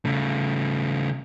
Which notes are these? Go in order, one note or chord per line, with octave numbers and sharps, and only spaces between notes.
C#3 A3